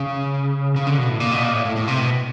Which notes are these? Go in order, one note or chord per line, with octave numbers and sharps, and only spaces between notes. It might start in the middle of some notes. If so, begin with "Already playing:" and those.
Already playing: C#3
C#3
D3
B2
A2
A#2
B2
A#2
A2
A2
A2
C3
B2